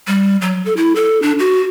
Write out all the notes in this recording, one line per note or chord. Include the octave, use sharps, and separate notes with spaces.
G3
F#3
A4
E4
A4
D4
F#4